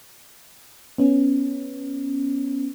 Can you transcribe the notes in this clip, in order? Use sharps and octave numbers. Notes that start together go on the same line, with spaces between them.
B3 C#4